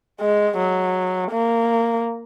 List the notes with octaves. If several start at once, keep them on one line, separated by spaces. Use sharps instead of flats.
G#3
F#3
A#3